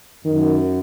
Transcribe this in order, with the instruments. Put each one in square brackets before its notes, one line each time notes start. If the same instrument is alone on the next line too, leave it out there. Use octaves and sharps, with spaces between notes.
[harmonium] F#2 [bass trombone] D#3